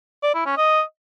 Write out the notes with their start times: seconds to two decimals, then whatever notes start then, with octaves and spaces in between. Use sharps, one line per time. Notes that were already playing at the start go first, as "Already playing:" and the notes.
0.23 D5
0.35 E4
0.46 C#4
0.57 D#5